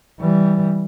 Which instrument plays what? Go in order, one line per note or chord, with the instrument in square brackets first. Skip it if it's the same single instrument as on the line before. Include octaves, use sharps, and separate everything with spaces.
[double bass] E3 G3